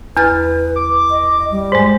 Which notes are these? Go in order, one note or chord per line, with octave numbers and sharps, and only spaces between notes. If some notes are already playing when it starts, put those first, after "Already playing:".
E2 B4 F6 A6
D6
D#5
G3
G#2 G#3 C5